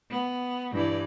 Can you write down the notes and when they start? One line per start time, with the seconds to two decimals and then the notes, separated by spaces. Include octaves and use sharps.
0.10 B3
0.73 G2 E3 D5